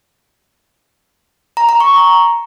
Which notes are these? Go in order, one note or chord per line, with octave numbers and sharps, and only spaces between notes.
A#5
A#5
C#6